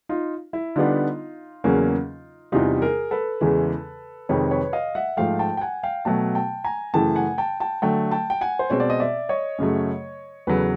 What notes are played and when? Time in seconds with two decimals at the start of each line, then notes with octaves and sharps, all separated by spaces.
0.09 D#4 F4
0.53 E4
0.76 D3 G3 B3 D4 D#4 F4
1.64 E2 C#3 F#3 A#3 C#4
2.52 E2 C3 E3 G3 D#4 F4
2.81 G#4 A#4
3.11 A4 B4
3.41 E2 C#3 E3 G#3
4.29 F2 C3 D#3 G#3 B4 C#5
4.51 B4 C#5
4.73 D#5 F5
4.95 E5 F#5
5.17 G#2 F3 A3 F5 G5
5.39 G5 A5
5.57 G5
5.61 F#5 G#5
5.83 F5 G5
6.05 B2 F#3 A3 G5 A5
6.35 G5 A5
6.64 G#5 A#5
6.94 F#2 C#3 E3 A3 G5 A5
7.16 F#5 G#5
7.38 G5 A5
7.60 G5 A5
7.82 D3 F#3 A3 G5 A5
8.11 G5 A5
8.30 G5
8.41 F#5 G#5
8.59 C5
8.70 B2 G#3 C4 C#5
8.80 D5
8.90 D#5
9.00 D5 E5
9.29 C#5 D#5
9.58 F#2 C#3 F#3 A3
10.47 E2 C#3 F#3 A4 B4